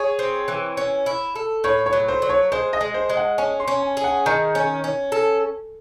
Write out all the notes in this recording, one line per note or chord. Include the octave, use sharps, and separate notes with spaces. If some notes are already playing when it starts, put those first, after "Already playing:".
Already playing: G#4 C#5
C4
E3
C#4
E4
A4
A2 C#5
C#5
F#3
C5
F#3
C#5
G#3 C5
D#5
G#3
C5
G#3
F#5
C#4 G#5
C6
C#4
G#5
G#4
F#5
D#3 G#5
C#4
C#4
A4